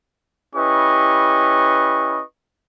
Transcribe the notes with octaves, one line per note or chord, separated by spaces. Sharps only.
C#4 E4 G4 B4 D#5 C#6